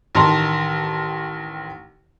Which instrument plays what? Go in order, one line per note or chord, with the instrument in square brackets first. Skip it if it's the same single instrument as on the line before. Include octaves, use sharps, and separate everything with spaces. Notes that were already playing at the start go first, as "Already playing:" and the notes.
[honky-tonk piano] A1 D#3 A5 A#5 C6